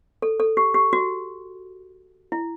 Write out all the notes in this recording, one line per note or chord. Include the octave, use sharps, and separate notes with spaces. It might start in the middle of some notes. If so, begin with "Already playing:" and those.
A4
A4
G4
G4
F#4
E4